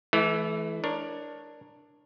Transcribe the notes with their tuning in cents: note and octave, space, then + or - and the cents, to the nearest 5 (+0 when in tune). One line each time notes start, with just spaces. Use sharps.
E3 +0 A3 -40
D4 +10 A#4 +15 C#5 +0